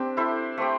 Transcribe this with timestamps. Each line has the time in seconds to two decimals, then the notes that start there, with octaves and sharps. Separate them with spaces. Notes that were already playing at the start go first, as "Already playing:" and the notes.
Already playing: C4 D4 G4
0.17 E4 A4 C5 E5
0.58 A3 C4 G4